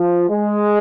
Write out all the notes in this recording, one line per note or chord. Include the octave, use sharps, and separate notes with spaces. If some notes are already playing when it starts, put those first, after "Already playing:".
Already playing: F3
G#3